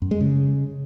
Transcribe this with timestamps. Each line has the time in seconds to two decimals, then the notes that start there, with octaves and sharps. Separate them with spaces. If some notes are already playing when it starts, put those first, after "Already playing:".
0.02 F#2
0.11 G#3
0.21 C#3